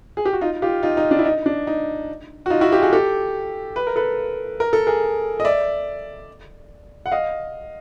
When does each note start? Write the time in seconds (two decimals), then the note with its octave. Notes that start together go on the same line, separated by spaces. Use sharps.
0.17 G#4
0.25 G4
0.33 F#4
0.41 D#4 F4
0.62 F4 G4
0.83 D#4 F4
0.97 D#4
1.11 D4
1.19 E4
1.26 D#4
1.46 D4
1.67 D#4
2.46 F#4
2.50 D#4 F4
2.61 E4 F#4
2.72 F4 G4
2.82 F#4 G#4
2.93 G4 A4
3.76 B4
3.87 A#4
3.96 A4 B4
4.60 A#4
4.73 A4
4.87 G#4 A#4
5.40 D#5
5.45 D5 E5
7.06 F#5
7.12 D#5 F5